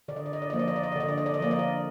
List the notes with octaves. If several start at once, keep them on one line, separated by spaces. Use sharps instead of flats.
D3 D5
D#5
D5
D#5
D5
F3 A#3 D#5
D5
D#5
D5
D#5
D5
D3 D#5
D5
D#5
D5
D#5
F3 A#3 D5
D#5
D5